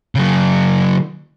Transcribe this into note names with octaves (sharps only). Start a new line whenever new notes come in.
C#3 F#3